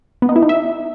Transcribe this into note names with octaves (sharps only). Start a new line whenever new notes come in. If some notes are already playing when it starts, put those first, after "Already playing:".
B3
D#4
E4
D#4
E5